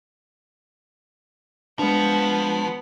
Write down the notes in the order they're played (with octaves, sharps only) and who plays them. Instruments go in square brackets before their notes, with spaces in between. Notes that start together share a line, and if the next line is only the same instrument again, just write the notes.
[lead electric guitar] F3 [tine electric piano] G#3 D4 [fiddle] B3